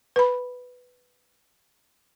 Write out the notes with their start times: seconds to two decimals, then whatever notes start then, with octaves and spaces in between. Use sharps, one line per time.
0.16 B4 B5